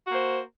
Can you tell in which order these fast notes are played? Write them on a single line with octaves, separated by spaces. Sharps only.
F#4 A#3 C5